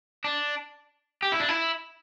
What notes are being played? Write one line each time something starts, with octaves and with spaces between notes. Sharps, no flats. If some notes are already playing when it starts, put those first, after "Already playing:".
D4
G4
E4
D4
E4